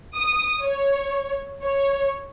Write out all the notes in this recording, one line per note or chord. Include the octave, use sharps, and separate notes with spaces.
D#6
C#5
C#5